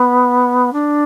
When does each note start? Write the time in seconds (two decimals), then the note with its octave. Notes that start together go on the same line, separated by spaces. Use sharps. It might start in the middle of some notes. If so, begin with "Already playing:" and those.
Already playing: B3
0.72 D4